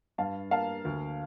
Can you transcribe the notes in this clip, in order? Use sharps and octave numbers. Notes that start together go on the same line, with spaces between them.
G2 F5 A5
A#3 F5 A5
D2